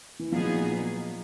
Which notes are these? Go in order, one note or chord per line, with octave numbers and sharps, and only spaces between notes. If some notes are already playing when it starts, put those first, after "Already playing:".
E3
A#2 F3 F#3 B3 D#4 G#4